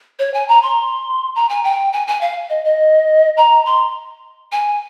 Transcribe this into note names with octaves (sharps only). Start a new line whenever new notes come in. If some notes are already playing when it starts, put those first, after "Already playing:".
C#5
G#5
A#5
C6
A#5
G#5
G5
G#5
G#5
F5
D#5
D#5
A#5
C6
G#5